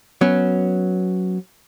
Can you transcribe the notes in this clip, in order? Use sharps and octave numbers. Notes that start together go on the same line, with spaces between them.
F#3 B3 C#4